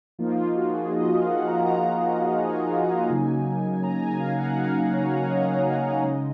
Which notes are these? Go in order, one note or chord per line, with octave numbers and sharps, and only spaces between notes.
F3 A#3 D#4 F4
F4
F#4
G#4
D#5
F5
F#5
A#5
A#5
A#5
F#5
G#5
C#3 F#3 A#3 D#4
A#5
G#5
F5
F#5
F5
C#5
D#5
F5
D#5
C#3 G#3 D#4